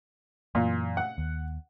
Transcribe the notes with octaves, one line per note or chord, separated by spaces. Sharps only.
F#2 A#2 E3
F#5
D#2